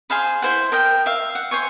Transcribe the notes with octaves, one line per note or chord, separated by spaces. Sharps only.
G#4 C5 F5 B5
E4 C5 F#5
A#4 D#5 G5
E5 F5
F#5
C5 C#5 G#5 C#6